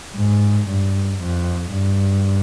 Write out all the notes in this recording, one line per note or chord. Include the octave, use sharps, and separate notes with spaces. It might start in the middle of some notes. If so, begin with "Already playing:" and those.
G#2
G2
F2
G2